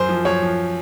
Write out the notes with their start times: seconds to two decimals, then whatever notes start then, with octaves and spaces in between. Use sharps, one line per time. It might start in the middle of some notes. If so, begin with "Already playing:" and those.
Already playing: F#2 C5
0.09 F3
0.25 F#2 C#5
0.42 F3